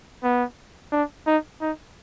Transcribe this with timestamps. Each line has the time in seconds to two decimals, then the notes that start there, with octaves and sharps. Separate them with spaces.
0.23 B3
0.92 D4
1.27 D#4
1.61 D#4